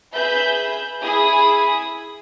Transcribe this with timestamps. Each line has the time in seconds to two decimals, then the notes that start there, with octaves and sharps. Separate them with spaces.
0.14 G#4 B4 E5 B5 G6
1.02 E4 G#4 B5 D#6